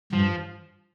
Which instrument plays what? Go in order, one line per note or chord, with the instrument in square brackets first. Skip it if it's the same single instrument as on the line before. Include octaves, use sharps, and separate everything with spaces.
[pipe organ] G2 [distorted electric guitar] F3